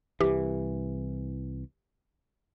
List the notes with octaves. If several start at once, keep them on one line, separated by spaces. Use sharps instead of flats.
C2 E3 G4